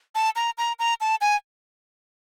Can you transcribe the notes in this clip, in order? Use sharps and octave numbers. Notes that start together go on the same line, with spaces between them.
A5
A#5
A#5
A#5
A5
G#5